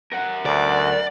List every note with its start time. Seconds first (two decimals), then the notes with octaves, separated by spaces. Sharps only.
0.13 A#4 F#5
0.46 D2 D5